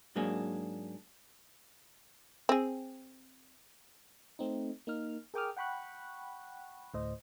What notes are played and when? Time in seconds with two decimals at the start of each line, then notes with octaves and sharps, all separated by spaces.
0.16 G#2 F#3 A#3 D4 G#4
2.49 C4 G#4
4.39 A3 C4 D#4
4.87 A#3 D#4 F6
5.34 G#4 A#4 G5 D6 D#6 F6
5.57 F#5 G5 B5 C#6 F#6
6.94 D2 A2 C5 D#5